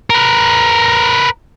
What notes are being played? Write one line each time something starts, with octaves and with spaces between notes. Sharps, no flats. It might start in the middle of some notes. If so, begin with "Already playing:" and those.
A#4 B4